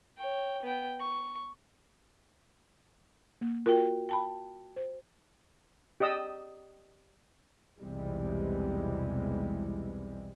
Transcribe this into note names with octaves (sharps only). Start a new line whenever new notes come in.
C#5 G5
B3 G5
C#6
A#3
F4 F#4 A#4 G5
G5 A5 B5
C5
G4 D5 D#5 D#6 E6
B1 E2 C3 E3 G3 G#3